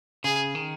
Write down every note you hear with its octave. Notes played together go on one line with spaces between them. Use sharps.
C#3 G#4
D#3